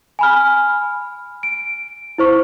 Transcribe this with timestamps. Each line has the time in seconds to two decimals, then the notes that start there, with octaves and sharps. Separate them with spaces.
0.19 G#5 B5 F6
1.43 D7
2.18 E4 C5 C#6